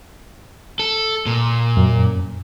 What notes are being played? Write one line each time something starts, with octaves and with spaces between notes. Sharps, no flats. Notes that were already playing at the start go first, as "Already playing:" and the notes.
A4
A#2
F#2